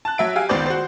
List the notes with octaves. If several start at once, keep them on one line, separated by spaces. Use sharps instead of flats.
A5 F#6
F#3 E5 D7
G4 F5 G#5
C#2 D#3 B3 C5 D5 G6
F#4 C5